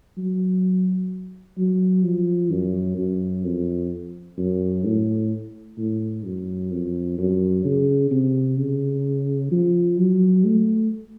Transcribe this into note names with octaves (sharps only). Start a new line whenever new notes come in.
F#3
F#3
F3
F#2
F#2
F2
F#2
A2
A2
F#2
F2
F#2
C#3
C3
C#3
F3
F#3
A3